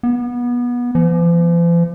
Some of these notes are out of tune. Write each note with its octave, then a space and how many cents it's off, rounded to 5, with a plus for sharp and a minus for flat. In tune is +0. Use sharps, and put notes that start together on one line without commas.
B3 -25
F3 -45